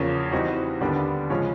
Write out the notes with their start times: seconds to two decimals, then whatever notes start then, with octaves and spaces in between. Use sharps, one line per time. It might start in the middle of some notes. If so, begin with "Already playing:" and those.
Already playing: E2 C#3 F3 A#3 C#4
0.32 E3 G3 C4 D#4 F#4
0.81 D#2 D3 G3 B3 D4
1.30 C#3 F3 G#3 C#4